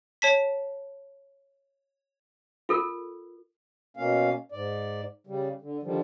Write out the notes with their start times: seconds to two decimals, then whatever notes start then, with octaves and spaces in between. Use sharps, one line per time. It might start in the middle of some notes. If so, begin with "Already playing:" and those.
0.22 C#5 A5 B6
2.69 F4 A4 A#4
3.97 B2 A#3 C#4 F5
4.52 G#2 D5
5.27 C#3 G3
5.61 D3
5.83 D3 D#3 F3 G3